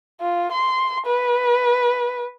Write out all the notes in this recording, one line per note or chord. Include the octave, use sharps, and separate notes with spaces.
F4
C6
B4